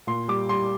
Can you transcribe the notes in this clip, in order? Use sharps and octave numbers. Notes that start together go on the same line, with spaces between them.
A#2 C6
G3 D6
G3 C6